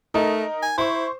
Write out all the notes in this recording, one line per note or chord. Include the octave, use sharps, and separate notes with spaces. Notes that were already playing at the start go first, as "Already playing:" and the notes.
A3 D#4 A#4 D#5
G#5
E4 C5 C#6